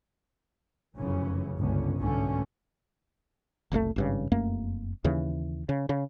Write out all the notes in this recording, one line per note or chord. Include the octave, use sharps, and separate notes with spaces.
F1 B1 F#2 C#3 E3 C#4
G1 C#2 D3 C#4
C2 G#2 B2 D3 A3 C#4
F#1 C2 A2 A3
G#1 G2 C#3
F1 F#2 A3 A#3
D#2 C#3 E3
C#3
C#3